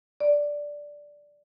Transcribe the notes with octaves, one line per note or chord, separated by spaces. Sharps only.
D5